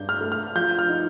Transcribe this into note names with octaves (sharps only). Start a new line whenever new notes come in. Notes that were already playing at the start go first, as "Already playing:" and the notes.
Already playing: G2 D4 G6
F6
A3
F6
F3 G6
F6
D#4